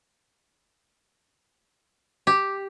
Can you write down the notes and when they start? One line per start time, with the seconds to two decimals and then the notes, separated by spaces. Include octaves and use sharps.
2.27 G4